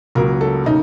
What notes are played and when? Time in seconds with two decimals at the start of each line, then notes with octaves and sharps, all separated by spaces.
0.15 C#2 C#3 F#3 A#3 A#4
0.41 A4
0.66 C#3 F#3 A#3 D#4